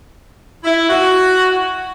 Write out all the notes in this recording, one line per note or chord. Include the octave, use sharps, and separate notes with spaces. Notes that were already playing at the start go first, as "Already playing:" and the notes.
E4
F#4